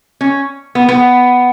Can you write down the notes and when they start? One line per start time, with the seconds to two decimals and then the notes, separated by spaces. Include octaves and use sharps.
0.21 C#4
0.75 B3
0.89 B3